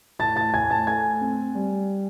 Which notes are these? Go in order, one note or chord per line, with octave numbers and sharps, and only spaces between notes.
A2 A5 A6
A5 A6
A2 G#5 G#6
A5 A6
A3 G#5 G#6
C4
G3